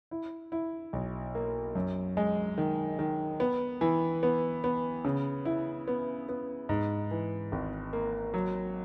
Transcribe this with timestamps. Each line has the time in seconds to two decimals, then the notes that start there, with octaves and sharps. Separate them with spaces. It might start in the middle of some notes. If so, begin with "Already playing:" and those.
0.11 E4
0.52 E4
0.93 B1
1.35 A#3
1.75 F#2
2.17 G#3
2.58 D#3
2.99 D#3
3.40 B3
3.81 E3
4.23 B3
4.64 B3
5.05 C#3
5.45 E4
5.88 B3
6.29 B3
6.69 G#2
7.11 E3
7.52 G#1
7.93 A#3
8.34 F#3